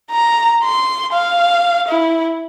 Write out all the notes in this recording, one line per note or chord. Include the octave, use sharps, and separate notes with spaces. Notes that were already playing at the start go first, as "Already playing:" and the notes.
A#5
C6
F5
E4